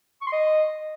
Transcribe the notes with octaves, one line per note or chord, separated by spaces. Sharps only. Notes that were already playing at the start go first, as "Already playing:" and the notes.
C#6
C6
D#5